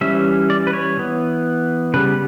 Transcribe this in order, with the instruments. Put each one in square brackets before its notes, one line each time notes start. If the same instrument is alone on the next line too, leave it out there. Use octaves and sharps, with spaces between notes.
[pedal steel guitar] E3 G3 C#4 E5
D5
B4
C#5
E3 B3
C#3 G3 B3 B4